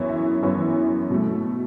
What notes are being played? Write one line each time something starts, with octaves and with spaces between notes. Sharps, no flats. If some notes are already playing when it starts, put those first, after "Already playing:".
Already playing: F#2 E3 B3 E4 C#5
E5
F#2 E3 B3 E4 C#5
B2 F#3 A3